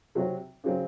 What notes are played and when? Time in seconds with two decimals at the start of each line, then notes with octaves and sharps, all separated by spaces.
0.15 C3 F#3 C4 F#4
0.64 C#3 F#3 C4